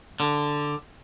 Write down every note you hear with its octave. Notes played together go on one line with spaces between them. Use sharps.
D3